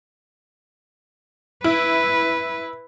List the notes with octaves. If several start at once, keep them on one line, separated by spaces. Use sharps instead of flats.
E4 B4